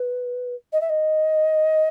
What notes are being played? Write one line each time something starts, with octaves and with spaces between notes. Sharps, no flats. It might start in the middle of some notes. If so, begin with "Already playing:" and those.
Already playing: B4
D#5
E5
D#5